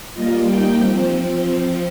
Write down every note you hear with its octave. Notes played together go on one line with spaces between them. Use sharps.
G3 A#3 F4 D#5
G3 A#3 D#4 G5
F3 C4